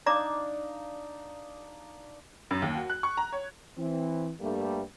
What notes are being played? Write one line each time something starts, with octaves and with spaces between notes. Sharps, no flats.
D4 D#4 D5 F5 A#5 D6
F#2
D#2
F#4
F#6
C#6
A#5
C#5
E3 C4
G2 G3 A3 A#3